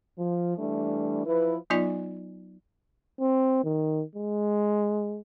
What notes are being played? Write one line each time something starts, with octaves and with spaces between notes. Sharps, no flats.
F3
E3 G3 A3 D4
F3 E4 B4
F#3 B3 D#4 F4 D5 G#5
C4
D#3
G#3